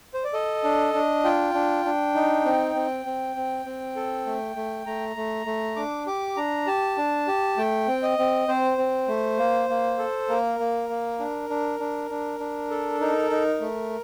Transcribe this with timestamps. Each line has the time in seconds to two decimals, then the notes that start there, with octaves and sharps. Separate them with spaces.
0.14 C5
0.24 D5
0.33 A4 D#5
0.64 D4
0.94 D4
1.25 F4 G5
1.54 D4
1.85 D4
2.15 D#4
2.45 C4
2.75 C4
3.06 C4
3.36 C4
3.66 C4
3.96 A4
4.26 A3
4.56 A3
4.86 A3 A#5
5.16 A3
5.46 A3
5.76 D4 D6
6.07 G4 D6
6.36 D4 A#5
6.67 G4 A5
6.97 D4
7.28 G4
7.57 A3 G5
7.87 C4
8.03 D#5
8.18 C4
8.48 C4 C5
8.78 C4
9.08 A3
9.39 A#3
9.69 A#3
9.98 A4
10.29 A#3 A#4
10.60 A#3
10.89 A#3
11.19 D4
11.50 D4
11.80 D4
12.10 D4
12.40 D4
12.70 A4
13.01 D#4 A#4
13.31 D#4
13.60 A3